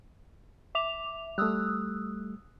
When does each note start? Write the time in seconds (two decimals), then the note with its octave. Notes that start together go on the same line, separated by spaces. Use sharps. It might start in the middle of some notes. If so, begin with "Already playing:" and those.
0.75 E5 D6 F7
1.38 G3 A3 D#6 E6 F#6